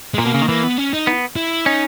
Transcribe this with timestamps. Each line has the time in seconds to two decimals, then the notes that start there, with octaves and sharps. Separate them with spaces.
0.14 G#3
0.18 A#2 A#3
0.26 B2
0.34 C#3
0.42 D#3
0.48 E3 A#3
0.63 B3
0.78 C#4
0.93 D#4
1.07 B3
1.36 E4
1.65 C#4 D#4